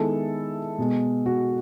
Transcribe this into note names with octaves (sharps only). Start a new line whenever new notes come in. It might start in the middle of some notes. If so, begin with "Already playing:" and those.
Already playing: D#3 G#3 B3 E4 A4
B2 G#3 B3
F#4